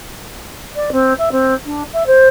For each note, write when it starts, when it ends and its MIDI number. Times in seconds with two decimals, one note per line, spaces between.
0.76 0.90 74
0.92 1.14 60
1.18 1.29 76
1.32 1.54 60
1.66 1.83 62
1.93 2.06 76
2.07 2.28 72